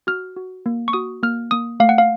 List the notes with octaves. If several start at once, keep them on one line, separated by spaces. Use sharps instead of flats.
F#4 F6
F#4
A#3
C#6
F#4 D#6
A#3 F6
A#3 D#6
A3 F5
F#5
F5